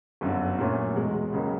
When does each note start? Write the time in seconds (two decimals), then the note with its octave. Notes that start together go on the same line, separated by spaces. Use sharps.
0.21 G1 F#2 D3
0.58 A#2 F#3 A3 C#4
0.95 E2 B2 G#3
1.32 C#2 C#3 F#3 A#3